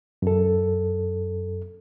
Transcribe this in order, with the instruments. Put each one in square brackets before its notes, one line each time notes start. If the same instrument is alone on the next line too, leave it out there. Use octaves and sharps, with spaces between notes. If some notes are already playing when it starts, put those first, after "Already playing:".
[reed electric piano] F#2 A4